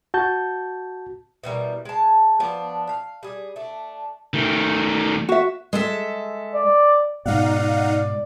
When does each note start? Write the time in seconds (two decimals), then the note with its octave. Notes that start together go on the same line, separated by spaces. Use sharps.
0.14 F#4 A5 G6
1.44 B2 E3 G3 A#4
1.85 G#3 A5
2.40 F3 B3 D4
2.89 F5
3.23 G3 G#4
3.56 A3 D4
4.34 D#3 A3
5.29 F#4 E5
5.73 G#3 A4 E5
6.55 D5
7.26 G#2 B2 D#4 D5 F5 F#5